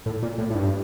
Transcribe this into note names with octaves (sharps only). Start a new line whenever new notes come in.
A2
A#2
A2
A2
G2